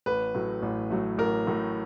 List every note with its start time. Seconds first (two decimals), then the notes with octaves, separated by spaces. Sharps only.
0.06 A1 B4
0.35 A2 F#3 A3
0.62 A1
0.90 A2 F#3 A3
1.18 A1 A#4
1.47 A2 F#3 A3